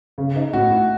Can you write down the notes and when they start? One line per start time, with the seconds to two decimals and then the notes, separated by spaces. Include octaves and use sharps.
0.18 C#3
0.36 D#4
0.53 A2 F#4
0.71 E4